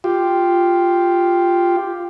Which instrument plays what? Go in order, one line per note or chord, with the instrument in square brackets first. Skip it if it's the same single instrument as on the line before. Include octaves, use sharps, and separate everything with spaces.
[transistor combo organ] F4 G4